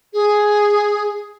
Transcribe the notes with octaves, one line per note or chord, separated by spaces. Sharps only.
G#4